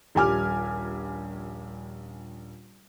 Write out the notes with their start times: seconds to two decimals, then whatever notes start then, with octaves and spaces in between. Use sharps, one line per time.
0.15 D#1 A#1 G3 G#5 D6 F6